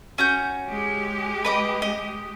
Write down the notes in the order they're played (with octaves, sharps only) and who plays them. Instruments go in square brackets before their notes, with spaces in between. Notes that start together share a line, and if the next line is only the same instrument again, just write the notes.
[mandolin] C#4 F#4 G6
[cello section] G#3 G4
[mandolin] B4 D#5 D6
D#5